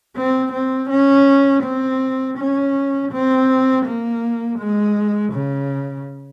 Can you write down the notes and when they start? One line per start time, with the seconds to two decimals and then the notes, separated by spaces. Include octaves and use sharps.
0.16 C4
0.53 C4
0.90 C#4
1.63 C4
2.38 C#4
3.12 C4
3.86 A#3
4.59 G#3
5.33 C#3